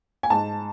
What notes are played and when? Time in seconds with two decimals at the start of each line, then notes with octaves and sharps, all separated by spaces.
0.23 G#5
0.30 G#2 A5